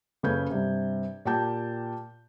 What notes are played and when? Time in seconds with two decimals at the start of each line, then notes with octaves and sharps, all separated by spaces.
0.23 F#1 C#3 A4 B4 G6 G#6
0.51 G2 C3
1.25 A#2 G4 G5 A5 G6